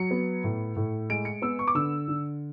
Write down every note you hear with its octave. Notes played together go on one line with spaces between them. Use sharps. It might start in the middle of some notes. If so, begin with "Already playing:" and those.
Already playing: F#3 C#7
B3
A2
A2
G#3 D7
C#7
B3 E6
C#6
D6
D3 E6
D3